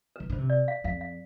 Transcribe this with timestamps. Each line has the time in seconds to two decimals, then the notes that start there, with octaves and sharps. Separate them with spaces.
0.16 D#3 B4
0.30 D3 C5
0.38 C3
0.50 D5
0.68 F5
0.84 F2 F5
1.01 F5